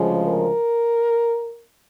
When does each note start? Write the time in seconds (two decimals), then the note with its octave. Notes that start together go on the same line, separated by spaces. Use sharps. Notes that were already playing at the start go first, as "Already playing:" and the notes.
Already playing: D2 C#3 F3 G#3
0.22 A#4